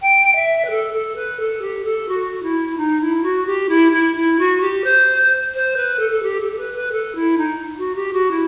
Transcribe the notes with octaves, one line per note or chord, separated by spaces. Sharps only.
G5
E5
B4
A4
A4
B4
A4
G4
A4
F#4
E4
D#4
E4
F#4
G4
E4
E4
E4
F#4
G4
C5
C5
B4
A4
A4
G4
A4
A4
B4
B4
A4
E4
D#4
F#4
G4
F#4
E4